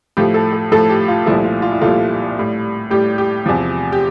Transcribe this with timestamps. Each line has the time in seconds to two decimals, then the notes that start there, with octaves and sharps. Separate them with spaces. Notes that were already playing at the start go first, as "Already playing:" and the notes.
0.17 A2 F3 A3 G4
0.34 A4
0.53 A4
0.72 A2 F3 A3 A4
0.89 G4
1.08 F4
1.26 C2 A#2 F3 A3 E4
1.44 F4
1.62 F4
1.72 E4
1.81 C2 A#2 F3 A3 F4
2.37 A2 G3
2.91 A2 G3 G4
3.18 G4
3.46 E2 C3 F3
3.92 G4